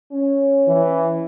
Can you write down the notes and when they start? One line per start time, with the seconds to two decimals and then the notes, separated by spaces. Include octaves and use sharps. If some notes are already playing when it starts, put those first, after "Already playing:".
0.12 C#4
0.68 E3